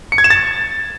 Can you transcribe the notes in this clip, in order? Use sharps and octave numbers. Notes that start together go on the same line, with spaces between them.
C#7
G#6
E7
A6